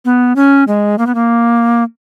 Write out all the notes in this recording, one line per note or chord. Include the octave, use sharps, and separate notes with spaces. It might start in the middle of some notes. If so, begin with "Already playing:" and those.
B3
C#4
G#3
A#3
B3
A#3